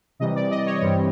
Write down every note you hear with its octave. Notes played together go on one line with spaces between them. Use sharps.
C3 E3 G3 D#5
D5
D#5
C#5
G2 E3 G3 C4